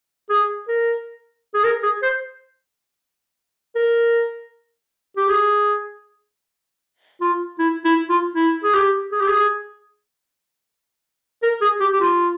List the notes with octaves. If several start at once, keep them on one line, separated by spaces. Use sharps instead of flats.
G#4
A#4
G#4
A#4
G#4
C5
A#4
G4
G#4
F4
E4
E4
F4
E4
G#4
G4
G#4
G4
G#4
A#4
G#4
G4
G4
F4